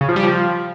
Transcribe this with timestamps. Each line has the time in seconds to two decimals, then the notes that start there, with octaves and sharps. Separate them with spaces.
0.01 C#3
0.08 F3
0.16 G3
0.24 F3